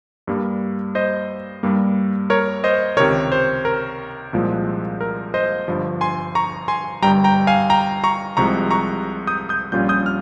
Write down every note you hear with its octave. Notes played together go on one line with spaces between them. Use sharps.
G2 G3 A#3
C5 D#5
G2 G3 A#3
A#4 C#5
C5 D#5
C#2 C3 D#3 A#4 C#5
C5
A#4
C2 A#2 F3 G#3
A#4
C5 D#5
G1 G2 F3
G#5 C6
A#5 C#6
G#5 C6
G1 G2 G3 G5 A#5
G5 A#5
F5 G#5
G5 A#5
A#5 C#6
C2 C3 F3 G#3 A#5 C#6
A#5 C#6
D#6 G6
D#6 G6
A#1 A#2 G3 C#4 F4 G6
D#6 G6
F6